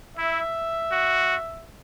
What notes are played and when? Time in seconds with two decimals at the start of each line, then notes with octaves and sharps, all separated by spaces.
0.17 E4 E5
0.92 F#4